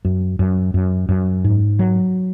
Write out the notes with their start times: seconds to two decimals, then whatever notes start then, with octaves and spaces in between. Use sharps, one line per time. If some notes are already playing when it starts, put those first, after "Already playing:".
0.05 F#2
0.39 F#2
0.74 F#2
1.09 F#2
1.44 G#2
1.79 F#3